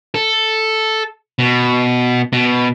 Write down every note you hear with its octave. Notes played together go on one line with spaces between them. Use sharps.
A4
B2
B2